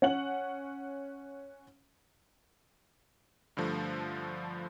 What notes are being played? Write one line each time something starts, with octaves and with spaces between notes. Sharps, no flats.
C#4 F#5 F#7
G2 D3 F3 A3